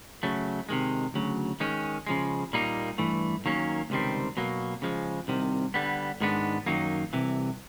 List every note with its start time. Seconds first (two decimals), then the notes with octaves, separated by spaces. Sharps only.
0.23 C#3 F#3 A3
0.69 C3 D#3 G#3
1.14 D2 C#3 F#3
1.60 D#3 G#3 C#4
2.07 C#3 F3 G#3
2.53 A#2 G3 A#3 D#4
2.98 G2 E3 A3
3.45 D#2 D#3 F#3 A#3 C#4
3.90 C#2 C3 D#3 G3 C4
4.37 B2 F#3 A#3
4.82 C#3 F3 G#3
5.28 C2 C3 D#3
5.74 D3 G3 B3
6.21 G#2 D#3 G#3 B3 D4
6.66 F#2 D#3 F#3 A#3 D#4
7.13 C2 C3 E3